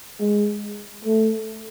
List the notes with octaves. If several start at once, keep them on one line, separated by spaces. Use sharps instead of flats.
G#3
A3